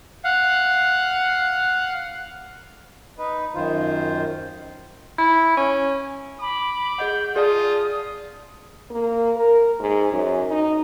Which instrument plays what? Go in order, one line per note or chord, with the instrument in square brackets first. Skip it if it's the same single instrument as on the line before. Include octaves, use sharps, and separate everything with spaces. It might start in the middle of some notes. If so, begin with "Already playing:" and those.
[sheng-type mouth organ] F5 F#5
[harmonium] D#4 B4
F#2 D#3 F4 C5
[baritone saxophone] E4
C#4
[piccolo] B5 [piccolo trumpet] D6
[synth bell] G#4 D#5 F#5 [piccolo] G6
[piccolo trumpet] F4 [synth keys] G#4 [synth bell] D5 F5 A5 [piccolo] D#6
[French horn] A#3
A#4
G#2
F#2
D#4